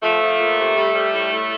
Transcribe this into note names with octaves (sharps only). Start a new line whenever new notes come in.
F3 A3
F3
A#2
C3
G3
G3
A2
A2